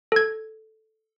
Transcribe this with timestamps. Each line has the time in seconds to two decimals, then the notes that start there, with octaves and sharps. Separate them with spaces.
0.12 A4 G#6